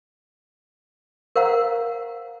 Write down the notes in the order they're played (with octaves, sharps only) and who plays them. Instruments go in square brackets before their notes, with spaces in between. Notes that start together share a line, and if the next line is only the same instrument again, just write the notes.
[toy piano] A#4 C5 F5 F#5 A#5